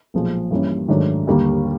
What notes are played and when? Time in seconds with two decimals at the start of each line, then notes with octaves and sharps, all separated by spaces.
0.14 B1 A#2 F3 G#3
0.51 G2 E3 G3 A#3 C#4
0.88 G#2 D#3 F#3 A3 D4
1.27 D#2 D3 G3 A#3